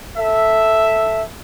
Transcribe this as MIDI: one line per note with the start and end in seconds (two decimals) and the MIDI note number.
0.17 1.23 69
0.17 1.23 76